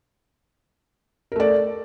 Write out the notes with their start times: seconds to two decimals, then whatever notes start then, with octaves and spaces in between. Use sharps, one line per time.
1.32 A#4
1.36 A3
1.40 D5